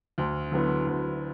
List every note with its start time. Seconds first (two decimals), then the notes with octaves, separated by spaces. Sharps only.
0.18 D2
0.52 D3 F#3 B3 E4
0.87 D2